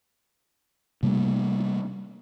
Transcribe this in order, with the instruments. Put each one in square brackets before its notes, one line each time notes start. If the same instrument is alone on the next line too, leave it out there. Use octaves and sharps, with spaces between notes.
[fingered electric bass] C3 G3 A3 A#3